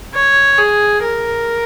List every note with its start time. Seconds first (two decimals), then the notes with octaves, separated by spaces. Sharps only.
0.15 C#5
0.58 G#4
1.03 A#4